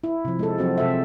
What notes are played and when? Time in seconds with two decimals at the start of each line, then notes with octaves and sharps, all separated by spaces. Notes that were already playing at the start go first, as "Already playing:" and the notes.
0.04 E4
0.25 C3 F3
0.39 G#3 A4
0.58 F3 F#3 C4 F#4
0.78 C3 A4 E5